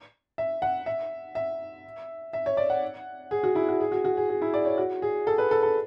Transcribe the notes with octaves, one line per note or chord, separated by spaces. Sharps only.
E5
F#5
E5
E5
E5
C#5
D5
F#5
G#4
F#4
E4
F#4
G#4
F#4
F#4
G#4
G#4
E4
D5
C#5
F#4
G#4
A4
B4
A4
A4